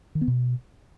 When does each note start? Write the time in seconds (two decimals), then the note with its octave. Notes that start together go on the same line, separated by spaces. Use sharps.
0.15 D#3
0.21 B3
0.28 B2